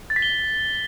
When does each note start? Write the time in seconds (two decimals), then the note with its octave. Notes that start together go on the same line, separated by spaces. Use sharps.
0.10 A6
0.16 B6
0.22 G7